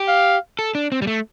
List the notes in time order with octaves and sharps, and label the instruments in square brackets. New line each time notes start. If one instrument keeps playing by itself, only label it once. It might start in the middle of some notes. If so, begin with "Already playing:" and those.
Already playing: [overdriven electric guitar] G4
[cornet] F5
[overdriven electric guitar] A4
D4
C4
G3
A3